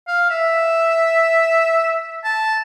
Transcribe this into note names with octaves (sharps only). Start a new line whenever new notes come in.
F5
E5
A5